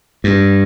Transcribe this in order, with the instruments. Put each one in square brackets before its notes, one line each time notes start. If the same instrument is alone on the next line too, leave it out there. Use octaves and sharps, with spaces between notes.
[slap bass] G2